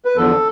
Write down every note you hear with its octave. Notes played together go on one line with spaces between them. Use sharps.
B4
E2 D3 F3 A4